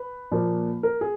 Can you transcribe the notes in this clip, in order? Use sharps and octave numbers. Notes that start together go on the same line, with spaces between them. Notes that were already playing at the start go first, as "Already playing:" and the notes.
Already playing: B4
A#2 F3 A#3
A#4
G#4